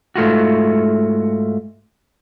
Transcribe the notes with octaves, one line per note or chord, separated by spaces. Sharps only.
G#2 A3 F4 F#4